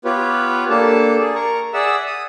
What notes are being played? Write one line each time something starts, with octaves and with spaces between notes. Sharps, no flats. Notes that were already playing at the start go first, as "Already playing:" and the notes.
B3 F4 G4 B4 C#5
A#3 D4 G4 A4 A5
G#4 D5
A#4 A#5 C#6
G#4 D5 E5 F#5 E6
D#6